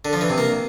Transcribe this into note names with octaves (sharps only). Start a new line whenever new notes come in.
D3
F3
E3
C3
A#3